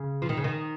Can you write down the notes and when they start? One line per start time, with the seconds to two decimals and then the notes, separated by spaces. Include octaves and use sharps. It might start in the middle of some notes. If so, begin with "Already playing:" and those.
Already playing: C#3
0.22 F3
0.29 D#3
0.37 C#3
0.44 D#3